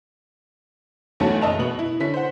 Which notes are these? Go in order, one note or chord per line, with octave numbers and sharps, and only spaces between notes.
B1 E2 A3 C#4 F#4 A5
F#1 D#5 E5 A5 F7
B2 B3 F#7
E4
D3 C#4 E4 B6
C5 F#5